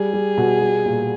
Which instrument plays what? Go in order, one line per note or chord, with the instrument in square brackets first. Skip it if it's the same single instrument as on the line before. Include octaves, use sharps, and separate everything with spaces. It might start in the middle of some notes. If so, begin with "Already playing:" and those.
Already playing: [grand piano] G3 [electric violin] G#4
[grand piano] G3
B2
G3
A#2